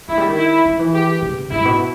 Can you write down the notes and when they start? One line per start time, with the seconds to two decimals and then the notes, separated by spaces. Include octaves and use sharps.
0.08 E3 E4
0.18 G3
0.27 D#3
0.36 E4
0.65 D#3
0.79 E3
0.94 G4
1.22 C#3
1.51 G#2 E4
1.65 B2